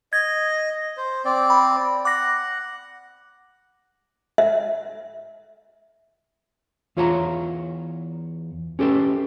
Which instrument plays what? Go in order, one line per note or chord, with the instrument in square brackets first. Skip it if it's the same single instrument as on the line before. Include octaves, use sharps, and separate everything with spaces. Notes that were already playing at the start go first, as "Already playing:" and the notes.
[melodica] D#5 [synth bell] G#6
[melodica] C5
C4 D5
[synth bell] B5
[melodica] F#5 [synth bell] D6 A#6
[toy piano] E5
[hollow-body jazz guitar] E2 F4 C#5 F#5 A5 A#5
C#4 G4 A4 B4